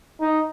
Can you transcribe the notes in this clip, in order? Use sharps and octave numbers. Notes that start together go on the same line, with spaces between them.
D#4